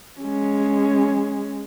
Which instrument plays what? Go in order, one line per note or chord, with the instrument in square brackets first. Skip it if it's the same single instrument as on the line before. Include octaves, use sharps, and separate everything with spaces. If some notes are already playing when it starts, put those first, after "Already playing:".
[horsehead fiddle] G#3 C#4